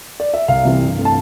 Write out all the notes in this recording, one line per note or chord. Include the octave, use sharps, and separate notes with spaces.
D5
E5
C2 F5
C3 E3 G3 C4
G2
E3 A3 C4
A5